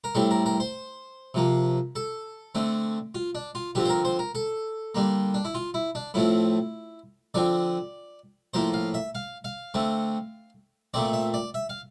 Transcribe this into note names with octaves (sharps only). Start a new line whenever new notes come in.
A#4
A2 G3 C4 A4
A#4
A#4
C5
C3 F3 A#3
A4
D3 A3 C4
F4
D4
F4
D3 F3 C4 G4
C5
A#4
C5
A#4
A4
D3 G3 A#3
D4
E4
F4
E4
D4
A2 F3 A3 C4 E4
D3 F3 C4 D5
A2 F3 A#3 C5
F5
E5
F5
F5
D3 A3 C4
A#2 A3 C4 D5
E5
D5
E5
F5